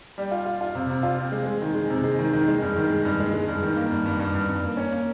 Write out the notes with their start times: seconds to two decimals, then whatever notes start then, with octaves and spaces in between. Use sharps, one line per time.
0.18 G3
0.31 F4
0.46 F4
0.61 F4
0.75 C3
0.90 C3
1.03 F4
1.18 C4
1.32 G#3
1.47 G#3
1.62 D#3
1.75 G#3
1.90 C3
2.04 G#3
2.19 D#3
2.33 D#3
2.48 G#3
2.62 G2
2.76 D#3
2.90 G#3
3.05 G2
3.20 G#3
3.34 G#3
3.48 G2
3.63 D#3
3.76 A#3
3.91 G2
4.06 G2
4.20 G2
4.34 G2
4.49 G2
4.64 A#3
4.77 C#4
4.92 A#3